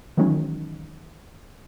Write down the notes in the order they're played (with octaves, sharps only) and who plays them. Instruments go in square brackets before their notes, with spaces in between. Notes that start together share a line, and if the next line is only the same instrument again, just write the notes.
[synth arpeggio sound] D#3 E3 F#3 G#3 C#4 D#4